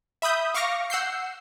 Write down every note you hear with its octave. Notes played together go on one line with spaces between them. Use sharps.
E5 B5 D#6 G6
F5 C#6 D6 F6 A#6
F#5 E6 G6 C7